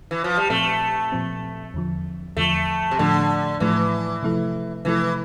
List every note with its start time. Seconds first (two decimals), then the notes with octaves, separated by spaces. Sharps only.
0.11 E3
0.24 F3
0.37 G3
0.50 A#2 F3 A3 C4
1.12 A#2 F3 C4
1.74 E2 D3 F3
2.37 E2 D3 F3 A3
2.91 C3
2.99 A2 D3 F3 A3
3.60 A2 E3 F3 A3
4.23 C3 F3 A3 E4 A4
4.85 C3 E3 F3 A3 E4 A4